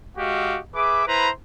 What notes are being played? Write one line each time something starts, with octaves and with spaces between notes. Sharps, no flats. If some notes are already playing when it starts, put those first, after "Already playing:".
G#3 F#4 G4 D#5 F5
G#4 B4 E5 D6
E4 B4 C5 A#5 B5